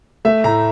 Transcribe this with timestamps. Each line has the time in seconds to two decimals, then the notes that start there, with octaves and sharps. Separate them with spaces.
0.25 A3 E5
0.44 A2 A#5